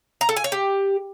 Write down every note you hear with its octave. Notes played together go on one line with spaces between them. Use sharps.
A#5
A4
G#5
C#5
G4